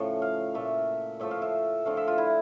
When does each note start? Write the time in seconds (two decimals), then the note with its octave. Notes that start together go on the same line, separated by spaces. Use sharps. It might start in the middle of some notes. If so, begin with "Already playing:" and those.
Already playing: A2 C#3 F3 A3 E5
0.22 F5
0.54 A#2 A3 E5
1.20 A2 F3 A3 E5
1.31 F5
1.42 E5
1.85 D3 F3 A3 F5
1.97 E5
2.08 F4
2.18 E4